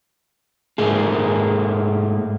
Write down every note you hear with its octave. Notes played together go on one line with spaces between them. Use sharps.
G#2 A3 A#3 G#4